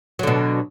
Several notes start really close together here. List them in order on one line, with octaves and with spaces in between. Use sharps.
F#3 D3 B2